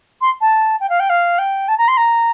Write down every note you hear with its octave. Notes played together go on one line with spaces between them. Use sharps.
C6
A5
G5
F5
G5
F5
G5
A5
A#5
C6
A#5